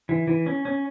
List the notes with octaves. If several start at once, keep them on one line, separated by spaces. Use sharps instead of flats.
E3
E3
C#4
C#4